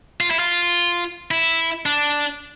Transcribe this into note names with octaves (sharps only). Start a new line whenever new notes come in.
F4
E4
F4
E4
D4